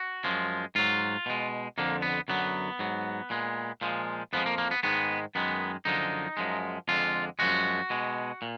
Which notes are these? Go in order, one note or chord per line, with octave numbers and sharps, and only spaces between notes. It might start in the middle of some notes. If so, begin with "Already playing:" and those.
Already playing: F#4
F#2 F3 G#3
G#2 F#3 F4
B2 G#3
F2 D3 F3 A#3
B3
F#2 D3 F#3 B3
G#2 F#3
A#2 G#3
A#2 F3 G#3
F2 F3 G#3 B3
A#3
A#3
B3
G#2 D#3 G#3 B3
F#2 D#3 G#3 B3
F#2 D3 F3 G#3 D#4
F#2 F3 G#3
F2 D3 G#3 F4
F#2 F3 G#3 F#4
B2 G#3
A#2